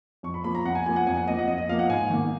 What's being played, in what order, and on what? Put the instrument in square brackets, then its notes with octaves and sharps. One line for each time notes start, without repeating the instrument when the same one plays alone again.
[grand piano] F2 C#6
B5
F3 A#3 B5
A#5
F2 F#5
G#5
F3 A#3 G#5
F#5
F2 G#5
F#5
F3 A#3 D#5
F#5
F2 D#5
D#5
F3 A#3 F5
F#5
G#2 G#5
D#3 A#3